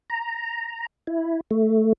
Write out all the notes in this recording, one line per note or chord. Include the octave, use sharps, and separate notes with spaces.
A#5
E4
A3